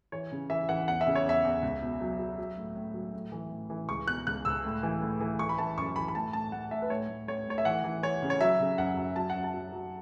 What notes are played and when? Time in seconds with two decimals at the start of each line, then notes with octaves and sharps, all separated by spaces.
0.12 E3 C#5
0.31 C#3
0.50 E3 E5
0.69 E3 F#5
0.88 E2 F#5
1.01 E5
1.06 C#3
1.15 C#5
1.25 E2 E5
1.44 E2
1.62 C#2
1.82 B2
2.01 F#3
2.19 F#3
2.38 F#3
2.58 A2
2.76 A2
2.94 F#3
3.13 A2
3.32 E3
3.51 A2
3.70 E3
3.88 C#2 C#6
4.07 B2 F#6
4.27 C#2 F#6
4.45 C#2 E6
4.65 A2
4.83 E3
5.02 A2
5.20 E3
5.39 E3 C#6
5.49 B5
5.58 E3 A5
5.77 F#2 C#6
5.96 E3 B5
6.08 B5
6.15 A2 A5
6.33 A2 A5
6.52 A2 F#5
6.71 A2 E5
6.82 B4
6.90 A2 C#5
7.09 A2
7.28 A2 C#5
7.47 A2 C#5
7.58 E5
7.65 E3 F#5
7.84 E3
8.03 E3 C#5
8.22 C#3
8.30 C#5
8.40 F#3 E5
8.60 C#3
8.78 F#2 F#5
8.97 F#2
9.16 F#3 A5
9.30 F#5
9.35 F#2
9.44 A5
9.54 F#3
9.72 F#3